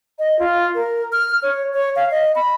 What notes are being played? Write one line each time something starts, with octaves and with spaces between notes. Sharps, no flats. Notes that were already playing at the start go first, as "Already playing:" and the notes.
D#5
F4
A#4
F6
C#5
C#5
F5
D#5
B5